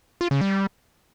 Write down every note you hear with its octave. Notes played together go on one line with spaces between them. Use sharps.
F4
C#3
G3